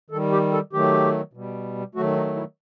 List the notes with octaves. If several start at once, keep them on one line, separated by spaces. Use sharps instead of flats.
D#3 G3 A4
G4
A4
D#3 F#3 A3 G4
B2 G3
D#3 F#3 A3 F#4
D#4
E4